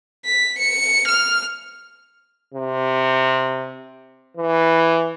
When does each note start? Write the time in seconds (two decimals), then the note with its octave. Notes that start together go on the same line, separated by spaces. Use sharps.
0.25 B6
0.59 C#7
1.08 F6
2.54 C3
4.37 E3